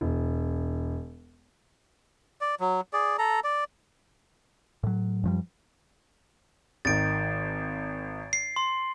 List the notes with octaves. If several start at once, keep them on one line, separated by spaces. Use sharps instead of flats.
E1
D5
F#3
G#4 D5
A4 A#5
D5
A2 F#3
F#2 F3 G3
G#1 D#3 A6 D7
C7
C6